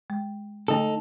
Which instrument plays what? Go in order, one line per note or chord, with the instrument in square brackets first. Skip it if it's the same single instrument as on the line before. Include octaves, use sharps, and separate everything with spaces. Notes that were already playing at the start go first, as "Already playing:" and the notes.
[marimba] G#3
[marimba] D3 A3 [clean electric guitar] D#4 A4